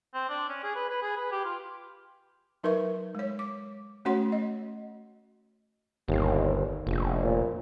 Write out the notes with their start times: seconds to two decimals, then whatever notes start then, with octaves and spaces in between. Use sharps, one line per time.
0.14 C4
0.29 D4
0.49 C#4
0.63 G#4
0.75 B4
0.90 B4
1.02 G#4
1.17 B4
1.32 G4
1.44 F4
2.63 F#3 D#4 A#4 B4 E5 C#6
3.15 G#3 C#5
3.39 D6
4.05 A3 C#4 F#4 C#5 F#5 C6
4.32 D#5
6.08 G1 D#2
6.87 F1 A#1
7.24 A#2